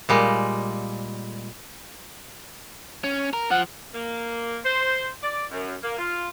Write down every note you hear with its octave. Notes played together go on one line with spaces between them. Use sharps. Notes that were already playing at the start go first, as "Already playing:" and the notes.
A#2 G3 G#3
C#4
A#4
F3 F#5
A#3
C5
D5
F#2
A#3
F4